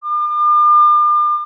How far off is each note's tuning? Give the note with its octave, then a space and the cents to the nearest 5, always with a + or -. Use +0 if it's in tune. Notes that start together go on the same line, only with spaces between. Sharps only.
D6 +40